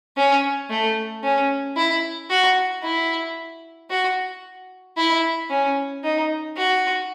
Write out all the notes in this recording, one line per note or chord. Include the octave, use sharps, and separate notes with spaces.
C#4
A3
C#4
E4
F#4
E4
F#4
E4
C#4
D#4
F#4